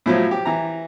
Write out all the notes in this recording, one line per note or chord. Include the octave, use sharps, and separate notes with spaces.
A2 F3 F#3
G4
E3 A#5